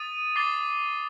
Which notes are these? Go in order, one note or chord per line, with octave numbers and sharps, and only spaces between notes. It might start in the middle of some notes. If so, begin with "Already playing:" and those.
Already playing: D#6 A6 D#7
D6 A6 C7 G7